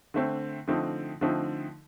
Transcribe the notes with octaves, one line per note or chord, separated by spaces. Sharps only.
D3 A3 C4
D3 F3 A3 C4 D#4
D3 F3 A3 C4 D#4